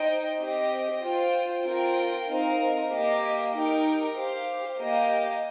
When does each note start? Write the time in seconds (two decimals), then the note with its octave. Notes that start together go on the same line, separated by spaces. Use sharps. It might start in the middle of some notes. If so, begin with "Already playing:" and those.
Already playing: D#4 C5 D#5 G5
0.39 C4 G4 D#5
1.02 F4 C5 G5
1.65 C4 F4 A#4 G5
2.27 C4 D#4 A#4 F5
2.91 A#3 G4 D#5
3.54 D#4 G4 A#4 G5
4.16 G4 C5 F5
4.79 A#3 G4 D#5